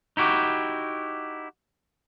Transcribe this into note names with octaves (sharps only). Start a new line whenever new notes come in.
D#4 E4 F#4 G4